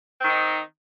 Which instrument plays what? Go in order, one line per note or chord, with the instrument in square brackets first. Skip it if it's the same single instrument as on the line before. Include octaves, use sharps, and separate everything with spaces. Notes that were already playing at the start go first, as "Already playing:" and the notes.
[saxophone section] C4
D#3
D#4